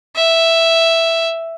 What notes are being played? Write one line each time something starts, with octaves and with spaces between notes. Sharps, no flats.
E5